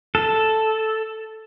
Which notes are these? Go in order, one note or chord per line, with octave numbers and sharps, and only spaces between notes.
A4